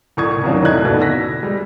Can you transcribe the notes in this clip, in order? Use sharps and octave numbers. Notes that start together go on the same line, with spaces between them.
C2 A2 C#6 D#6 G#6
D#2 C3 D#3 F#3 A#3 C#4
F1 E2 E4 D#5 F#6 G#6
D2 B2 D#3
E6 A#6 B6
G3 G#3